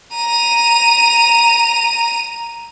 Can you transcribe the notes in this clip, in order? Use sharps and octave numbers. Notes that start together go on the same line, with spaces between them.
A#5 D#7